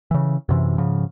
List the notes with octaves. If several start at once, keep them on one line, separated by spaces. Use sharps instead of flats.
C#3 E3
F#2 C3 E3
G#2 C#3 F3